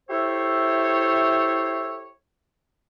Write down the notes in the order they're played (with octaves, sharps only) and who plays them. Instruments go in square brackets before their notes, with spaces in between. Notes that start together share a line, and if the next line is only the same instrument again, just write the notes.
[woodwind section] E4 G4 A4 C5 C#5 E5